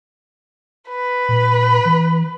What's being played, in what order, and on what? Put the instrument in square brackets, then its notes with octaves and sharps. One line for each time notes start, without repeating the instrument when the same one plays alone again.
[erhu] B4
[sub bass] A#2
E3